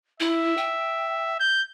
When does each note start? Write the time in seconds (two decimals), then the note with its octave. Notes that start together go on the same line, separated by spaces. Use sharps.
0.20 E4 E5
0.57 G5
1.40 G6